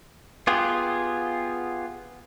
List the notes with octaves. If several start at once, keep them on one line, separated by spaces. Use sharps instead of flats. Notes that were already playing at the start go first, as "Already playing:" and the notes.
B3 F4 G4 G#4